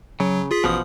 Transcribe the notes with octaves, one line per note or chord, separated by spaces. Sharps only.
C#3 F#3
F4 G#4 B6
A1 B2 F3 D#6